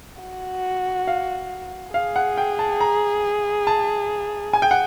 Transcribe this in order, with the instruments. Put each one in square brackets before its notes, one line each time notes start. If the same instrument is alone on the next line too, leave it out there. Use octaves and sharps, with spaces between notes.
[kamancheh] F#4
[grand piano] F5
[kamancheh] G#4 [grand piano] F5
[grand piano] F#5
G5
A5
A#5
A5
G#5
G5
F#5